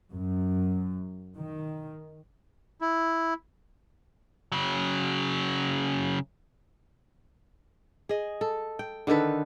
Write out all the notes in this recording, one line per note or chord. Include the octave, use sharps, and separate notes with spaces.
F#2
D#3
E4
C#3 F#3
G#4 D#5
A4
G5
D3 D#3 A4 B4